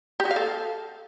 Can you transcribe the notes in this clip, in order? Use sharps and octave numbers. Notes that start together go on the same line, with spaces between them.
G4
F#4
F5
A4